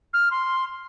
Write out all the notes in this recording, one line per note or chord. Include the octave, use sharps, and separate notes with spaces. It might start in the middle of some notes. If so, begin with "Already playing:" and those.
F6
C6